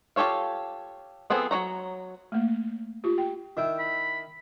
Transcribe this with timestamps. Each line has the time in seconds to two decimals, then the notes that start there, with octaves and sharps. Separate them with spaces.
0.16 F4 G4 A4 C#5 F5
1.30 F3 B3 C4 G#4 A4
1.51 F#3 D#4 C#5 A#5
2.32 A3 A#3
3.04 F4 G4
3.18 G5
3.57 D#3 E4 G5
3.79 B5